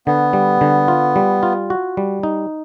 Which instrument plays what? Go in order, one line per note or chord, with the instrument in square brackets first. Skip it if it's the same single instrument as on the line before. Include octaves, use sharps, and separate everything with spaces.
[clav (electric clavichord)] D3 [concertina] B3
[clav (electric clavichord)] G3
D3
F4
G3
F4
F#4
G3
D#4